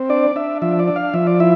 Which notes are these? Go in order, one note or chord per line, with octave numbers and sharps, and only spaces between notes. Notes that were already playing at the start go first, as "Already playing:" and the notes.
Already playing: C4
D4 D5
D4 E5
F3 E5
D5
D4
F5
F3 E5
D5
E4 E5